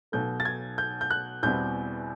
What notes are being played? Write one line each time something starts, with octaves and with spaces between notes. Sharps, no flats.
B1 B2 F#3 A3 G6
A6
G#6
G6
G6
F#6
E2 B2 G3 C4 E4 G6